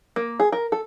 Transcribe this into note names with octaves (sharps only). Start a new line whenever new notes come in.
A#3
G#4
A#4
A4